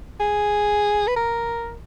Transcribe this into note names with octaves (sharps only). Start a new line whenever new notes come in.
G#4
B4
A#4